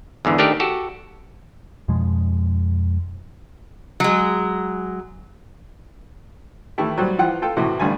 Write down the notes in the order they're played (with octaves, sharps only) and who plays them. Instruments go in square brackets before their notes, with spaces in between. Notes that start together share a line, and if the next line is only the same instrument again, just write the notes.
[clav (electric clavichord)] E2 G#2 D3 E3
D#3 A3 D4 D#4 G4 A#4
F#4 G4 A4
[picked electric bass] F2 B2 F3 G#3
[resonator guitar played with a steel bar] F#3 G#3
[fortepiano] D#3 E3 A3 E4 G4
F#3 G3 C5
E3 F3 F4 F#5 G5
F4 A4 G5
A2 C3 E3 F#4
A1 D3 G3 A3 F4 G#5